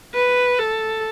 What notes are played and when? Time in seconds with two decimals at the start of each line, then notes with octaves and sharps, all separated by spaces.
0.14 B4
0.59 A4